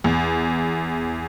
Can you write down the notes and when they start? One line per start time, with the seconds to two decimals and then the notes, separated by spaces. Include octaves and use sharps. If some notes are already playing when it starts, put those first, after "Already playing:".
0.04 E2